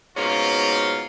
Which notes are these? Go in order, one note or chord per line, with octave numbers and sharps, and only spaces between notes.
G#2 B2 A#3 C#4 F4